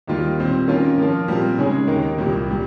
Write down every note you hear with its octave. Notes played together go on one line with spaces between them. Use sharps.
D#2 D#3 G3 A#3 F4
A#2 G3 C4
D#3 A#3 C#4 F4 A#4
F3 A#3 F4 A#4
A#2 G3 C4 F4 A#4
C#3 G#3 D#4 G#4 C#5
D#2 D#3 A#3
C2 A#2 G3 A#3
A#2 G3